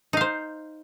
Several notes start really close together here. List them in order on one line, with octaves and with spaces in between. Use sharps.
D#4 F5 C5